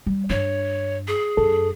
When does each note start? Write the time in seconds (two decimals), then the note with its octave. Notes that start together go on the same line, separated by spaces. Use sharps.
0.06 G3
0.30 G2 D4 C#5
1.08 G#4
1.37 F#2 A4